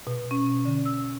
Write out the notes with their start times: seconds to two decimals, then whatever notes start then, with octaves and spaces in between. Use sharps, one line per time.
0.07 B2
0.31 C#4
0.65 D3
0.85 E6